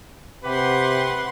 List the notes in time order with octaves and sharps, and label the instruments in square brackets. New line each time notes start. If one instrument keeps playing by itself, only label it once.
[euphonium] C3 [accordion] G4 [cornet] B4 [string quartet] F#5 C6